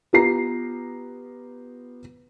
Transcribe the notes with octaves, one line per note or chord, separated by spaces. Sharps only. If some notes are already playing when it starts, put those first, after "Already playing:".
B3 F4 G4 B4 A#5 C7